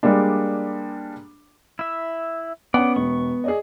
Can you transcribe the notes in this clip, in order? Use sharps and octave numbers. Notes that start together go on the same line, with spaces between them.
G3 G#3 A#3 D4
E4 E5
B3 C#4 D5 F#5
E1 C#6
G#4 D5 D#5